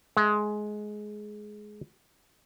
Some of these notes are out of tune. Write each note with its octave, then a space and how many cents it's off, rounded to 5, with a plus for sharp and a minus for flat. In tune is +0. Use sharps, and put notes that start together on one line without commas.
G#3 +15 E5 +0